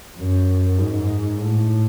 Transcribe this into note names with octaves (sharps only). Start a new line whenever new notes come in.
F#2
G#2
A2